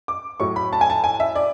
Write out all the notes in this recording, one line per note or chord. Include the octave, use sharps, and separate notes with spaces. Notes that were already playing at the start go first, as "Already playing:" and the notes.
D6
A2 F#3 C#6
B5
A5
G#5
A5
G#5
E5
D5